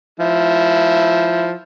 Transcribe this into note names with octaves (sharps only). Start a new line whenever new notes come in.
F3 E4